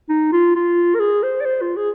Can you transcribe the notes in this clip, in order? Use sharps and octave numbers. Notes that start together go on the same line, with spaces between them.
D#4
F4
F4
A#4
G#4
C5
D5
C5
F4
G#4